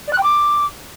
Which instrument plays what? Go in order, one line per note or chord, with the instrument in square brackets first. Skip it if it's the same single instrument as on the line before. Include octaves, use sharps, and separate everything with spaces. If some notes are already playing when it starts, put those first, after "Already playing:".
[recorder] D5
F#6
G5
D6